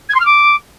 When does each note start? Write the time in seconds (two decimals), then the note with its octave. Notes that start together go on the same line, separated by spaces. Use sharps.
0.09 G#6
0.14 C6
0.20 F6
0.25 D6